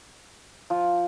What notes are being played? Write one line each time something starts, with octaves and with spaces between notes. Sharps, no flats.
F3